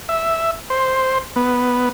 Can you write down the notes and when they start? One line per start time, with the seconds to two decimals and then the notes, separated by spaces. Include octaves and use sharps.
0.09 E5
0.70 C5
1.36 B3